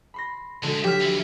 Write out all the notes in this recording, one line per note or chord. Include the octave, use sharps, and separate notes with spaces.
B5 C6 A#6
F#2 D3 G#3 F#4
F#3 G4 E5 F6
D3 E3 C#7